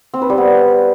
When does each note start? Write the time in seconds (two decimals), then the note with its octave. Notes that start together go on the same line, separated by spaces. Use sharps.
0.14 C4
0.22 B4
0.30 G3
0.38 B3